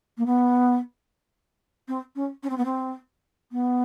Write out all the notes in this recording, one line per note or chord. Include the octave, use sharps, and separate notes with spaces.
A#3
B3
C4
C#4
C#4
C4
B3
C4
B3